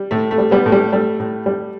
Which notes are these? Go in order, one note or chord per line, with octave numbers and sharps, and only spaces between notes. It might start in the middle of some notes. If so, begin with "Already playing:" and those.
Already playing: G3
A2 A3
A3
G3
G3 B3
A2
G3
G3 A3
A2
G3